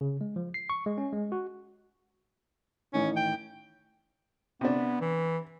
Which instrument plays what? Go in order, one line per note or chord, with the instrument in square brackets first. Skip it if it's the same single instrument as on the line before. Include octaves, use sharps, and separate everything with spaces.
[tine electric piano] C#3
G#3
F3
C7
C#6
G#3
C#4
G#3
F#4
[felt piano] A1 D#3 [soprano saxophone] C#4
[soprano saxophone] G5
[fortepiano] C3 D4 [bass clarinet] B3
[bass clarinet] E3